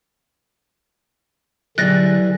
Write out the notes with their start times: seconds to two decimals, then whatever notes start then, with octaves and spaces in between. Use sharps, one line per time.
1.78 D3 E3 F#3 G3 G#4 F#6 A6 A#6